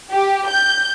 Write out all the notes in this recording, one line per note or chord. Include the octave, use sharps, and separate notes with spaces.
G4
G6